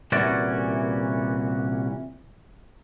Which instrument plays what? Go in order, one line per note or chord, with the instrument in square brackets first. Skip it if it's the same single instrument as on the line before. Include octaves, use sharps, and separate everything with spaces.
[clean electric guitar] C2 A#2 E3 C#4 F#4 D5